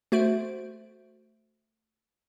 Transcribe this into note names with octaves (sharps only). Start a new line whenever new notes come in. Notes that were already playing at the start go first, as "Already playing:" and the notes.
A3 F#4 C5 D7